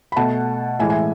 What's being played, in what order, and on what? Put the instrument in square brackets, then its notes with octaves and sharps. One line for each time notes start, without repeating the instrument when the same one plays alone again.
[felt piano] B5
B2 A3 F#5 A5
A2 E3 G#3 E5 G#5
E5 G#5